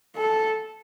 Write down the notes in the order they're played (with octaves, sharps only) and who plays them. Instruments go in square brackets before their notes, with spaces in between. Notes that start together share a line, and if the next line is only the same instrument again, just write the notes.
[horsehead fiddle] A4